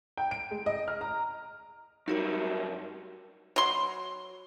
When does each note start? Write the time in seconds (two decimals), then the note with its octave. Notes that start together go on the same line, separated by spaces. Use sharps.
0.17 G5
0.31 D7
0.51 G#3
0.66 D#5
0.88 F6
1.01 A#5
2.08 F#2 G3 D#4 F#4 A#4
3.56 F#3 C6